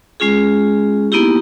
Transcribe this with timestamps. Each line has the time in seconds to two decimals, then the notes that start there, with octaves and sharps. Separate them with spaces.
0.20 G#3 C#4 F4 G#4
1.12 A#3 B3 D#4 E4 G4